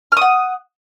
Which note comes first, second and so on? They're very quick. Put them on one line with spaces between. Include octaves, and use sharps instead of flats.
F6 D#6 F#5